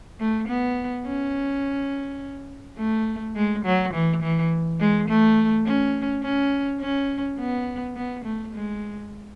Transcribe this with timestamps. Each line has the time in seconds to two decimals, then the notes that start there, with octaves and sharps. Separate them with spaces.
0.20 A3
0.48 B3
1.06 C#4
2.78 A3
3.35 G#3
3.65 F#3
3.94 E3
4.23 E3
4.80 G#3
5.09 A3
5.65 C#4
6.23 C#4
6.80 C#4
7.39 B3
7.96 B3
8.25 A3
8.53 G#3